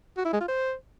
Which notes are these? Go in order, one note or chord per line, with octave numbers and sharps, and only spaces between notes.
F#4
E4
G#3
F4
C5